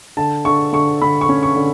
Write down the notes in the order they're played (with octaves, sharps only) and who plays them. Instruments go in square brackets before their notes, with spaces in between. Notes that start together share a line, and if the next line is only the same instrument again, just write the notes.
[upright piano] D3 A5
D3 C#6
D3 C#6
D3 B5
C#6
C#4
C#6
D3